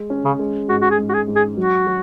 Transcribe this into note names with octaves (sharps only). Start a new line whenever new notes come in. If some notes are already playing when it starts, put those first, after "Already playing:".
Already playing: G#3
C#4
C#3
G#3
G#2 F#4
F#4
G#4
G#2
F#4
G#4
G#2
G#4
F#3 F#4
F#3